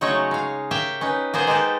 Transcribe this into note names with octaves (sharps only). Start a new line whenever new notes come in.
C#3 F#3 G#3 A3 D#4 C#5
G#3 F5
G4 A#4 C#5 E5 F5 G5
C#4 D#4 B4
A#3 B3 G#4 C5
G#3 D#4 G4 A4